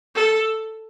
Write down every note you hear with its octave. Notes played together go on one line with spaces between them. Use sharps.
A4